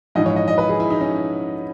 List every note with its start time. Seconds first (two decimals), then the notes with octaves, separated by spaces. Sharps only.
0.15 A#1 G#2 E3 D#5
0.26 C#5
0.36 D#5
0.48 D#5
0.58 B4
0.69 G#4
0.80 E4
0.90 D#4
1.01 C#4